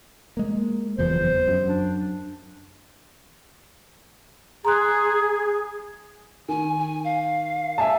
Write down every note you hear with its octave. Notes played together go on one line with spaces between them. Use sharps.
G#3 A#3
F#1 E2 F3 C5
F#2
D4
G#4 A#5 C6 F#6
D#3 G#5
G#5
F5
E5 G#5 A5